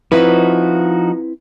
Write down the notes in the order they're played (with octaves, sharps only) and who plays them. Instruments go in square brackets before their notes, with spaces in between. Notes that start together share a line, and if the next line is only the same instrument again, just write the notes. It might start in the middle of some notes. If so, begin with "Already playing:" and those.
[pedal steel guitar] F3 D#4 F#4 [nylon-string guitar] C4 E4 B4